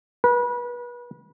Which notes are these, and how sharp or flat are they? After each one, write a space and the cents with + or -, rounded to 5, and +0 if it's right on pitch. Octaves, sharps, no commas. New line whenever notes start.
B4 -30